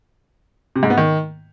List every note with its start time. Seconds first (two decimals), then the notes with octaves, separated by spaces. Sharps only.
0.76 C3
0.83 G#2
0.90 B3
0.97 D#3